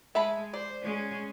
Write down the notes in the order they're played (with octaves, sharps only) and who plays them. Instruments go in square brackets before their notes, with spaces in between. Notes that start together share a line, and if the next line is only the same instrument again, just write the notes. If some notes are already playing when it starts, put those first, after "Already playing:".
[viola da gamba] G#3 [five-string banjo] E5 A5 B5
[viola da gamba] C5 [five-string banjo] D5
[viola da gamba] G#3 C#4